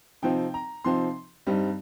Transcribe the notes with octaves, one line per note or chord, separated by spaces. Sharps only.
C3 F3 C4 D#4 G5
A#5
C3 F3 C4 D#4 C6
G2 G3 C4 D#4